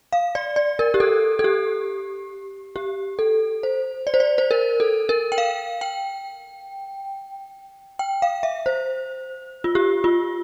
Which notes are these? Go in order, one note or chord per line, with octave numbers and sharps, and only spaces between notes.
F5
D5
D5
A#4
G4
A4
A4
G4
G4
A4
C5
D5
C5
D5
C5
A#4
A4
A#4
G5
F5
G5
G5
F5
E5
C5
F4
G4
F4